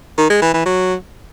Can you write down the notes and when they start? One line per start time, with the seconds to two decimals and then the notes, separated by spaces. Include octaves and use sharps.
0.18 D#3
0.30 G#3
0.42 E3
0.54 E3
0.66 F#3